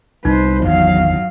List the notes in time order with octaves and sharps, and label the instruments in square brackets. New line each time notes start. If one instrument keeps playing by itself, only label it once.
[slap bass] C2 [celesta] D#4 [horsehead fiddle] B4 C5
[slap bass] G#1 E2 G#2 [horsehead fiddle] F#3 F5